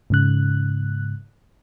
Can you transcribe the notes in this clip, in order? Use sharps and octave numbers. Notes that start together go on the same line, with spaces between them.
G#2 C#3 F#6